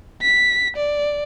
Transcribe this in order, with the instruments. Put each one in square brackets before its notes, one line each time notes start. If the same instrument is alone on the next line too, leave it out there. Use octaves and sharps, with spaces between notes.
[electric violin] B6
D5